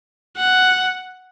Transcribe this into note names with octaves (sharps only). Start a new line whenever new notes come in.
F#5